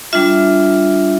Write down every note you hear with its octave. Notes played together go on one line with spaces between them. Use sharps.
G3 D4 F4 E5